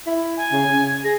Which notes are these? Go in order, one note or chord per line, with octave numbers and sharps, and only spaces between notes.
E4
G#5
C#3
C#3
G#4 A#6